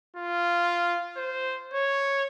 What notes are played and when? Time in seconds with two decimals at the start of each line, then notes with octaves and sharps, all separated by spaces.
0.16 F4
1.16 C5
1.74 C#5